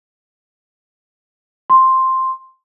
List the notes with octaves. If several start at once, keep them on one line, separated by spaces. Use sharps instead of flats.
C6